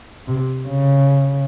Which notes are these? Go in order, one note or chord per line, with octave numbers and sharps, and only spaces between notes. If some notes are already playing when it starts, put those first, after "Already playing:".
C3
C#3